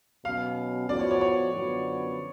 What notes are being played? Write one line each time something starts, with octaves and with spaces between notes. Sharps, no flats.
B2 F#3 C#4 F5
A2 F3 B3 F#4 D5
C#5
C#5
C#5
F#2 D3 F3 B3 F#4